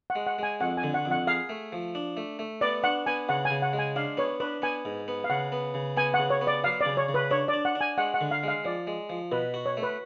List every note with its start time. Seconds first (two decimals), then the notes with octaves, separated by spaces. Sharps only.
0.10 F#5
0.15 G#3
0.27 F#5
0.38 G#3 G#5
0.61 F2 F#5
0.77 G#5
0.83 D3
0.94 F#5
1.05 F2
1.11 F#5
1.27 G#4 F5
1.49 A3
1.72 F3
1.95 D4
2.17 A3
2.39 A3
2.61 B3 D5
2.84 D4 F#5
3.06 B3 G#5
3.29 C#3 F#5
3.45 G#5
3.50 C#3
3.62 F#5
3.73 G#3
3.79 G#5
3.96 D4 F5
4.17 B3 C#5
4.40 D4 B4
4.62 B3 G#5
4.85 G#2
5.08 B3
5.24 F5
5.30 C#3 F#5
5.52 B3
5.74 C#3
5.97 B3 G#5
6.14 C#3 F#5
6.30 C#5
6.41 B3
6.47 D5
6.64 F#3 F5
6.81 C#3 D5
6.97 C#5
7.09 C#3
7.14 B4
7.31 D4 C#5
7.48 D5
7.53 D4
7.65 F#5
7.75 D4
7.81 G#5
7.98 G#3 F#5
8.14 F#5
8.21 D3
8.31 F5
8.43 G#3 F5
8.64 F3 D5
8.87 G#3
9.10 F3
9.32 B2 B4
9.54 F#4
9.66 C#5
9.77 A3
9.83 B4